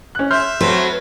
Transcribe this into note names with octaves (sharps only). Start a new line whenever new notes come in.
C#4 F#6
E5 C6 F6 G6
F#3 A3 C4 B4